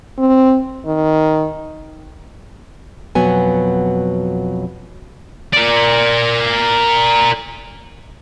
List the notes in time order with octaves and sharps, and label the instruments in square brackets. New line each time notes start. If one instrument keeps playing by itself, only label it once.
[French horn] C4
D#3
[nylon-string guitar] F2 B2 F#3 B3 G#5
[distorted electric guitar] A#4 D5